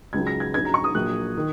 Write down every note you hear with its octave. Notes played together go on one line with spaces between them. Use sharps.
C#2 C#3 F#3 C#4 G#6
A#6
G#6
A#1 G#2 F#3 C#4 G#6
A#5
C#6
D#6
A#1 A#2 F#3 F#6
D#3